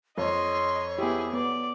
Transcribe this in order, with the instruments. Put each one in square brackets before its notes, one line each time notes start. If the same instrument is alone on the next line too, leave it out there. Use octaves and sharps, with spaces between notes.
[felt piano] F2 [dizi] C#5 [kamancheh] D#5 C6
[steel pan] B3 G4 [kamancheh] E4 G#4
[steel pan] B3 [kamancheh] D5